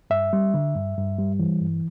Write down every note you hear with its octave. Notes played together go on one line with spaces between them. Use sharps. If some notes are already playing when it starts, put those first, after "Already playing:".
G2 E5
G3
D3
G2
G2
G3
E3
G2